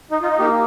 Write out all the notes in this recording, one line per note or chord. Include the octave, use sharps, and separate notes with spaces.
D#4
D#4 F4
A#3 G4